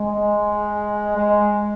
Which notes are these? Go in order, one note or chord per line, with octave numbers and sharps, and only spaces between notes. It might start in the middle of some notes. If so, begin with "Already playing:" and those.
Already playing: G#3
G#3